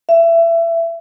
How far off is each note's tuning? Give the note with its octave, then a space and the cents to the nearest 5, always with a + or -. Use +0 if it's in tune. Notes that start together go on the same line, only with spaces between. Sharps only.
E5 +25